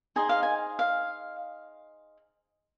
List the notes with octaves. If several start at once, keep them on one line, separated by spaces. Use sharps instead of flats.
D#4 G#4 C5 D#5 G#5
F5
G#5
F5